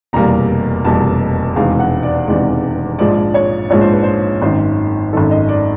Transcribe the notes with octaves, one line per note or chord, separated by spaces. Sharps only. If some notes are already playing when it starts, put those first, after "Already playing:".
F1 E2 B2 G3 A#3 A#5
F1 E2 B2 G3 A#3 A5
E1 E2 C3 D#3 G#3 F5
F#5
D5
E1 E2 C3 D#3 G#3 D5
A#1 G#2 F3 G#3 D5
C#5
A#1 G#2 F3 G#3 C#5
C5
B4
C5
G#1 F#2 D#3 C5
G#1 F#2 D#3 A4
D#5
D5